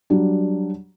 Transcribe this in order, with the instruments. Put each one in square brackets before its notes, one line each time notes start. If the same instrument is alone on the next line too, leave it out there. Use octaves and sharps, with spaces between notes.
[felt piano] F#3 G3 D4